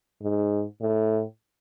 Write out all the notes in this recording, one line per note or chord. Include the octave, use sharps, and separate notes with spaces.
G#2
A2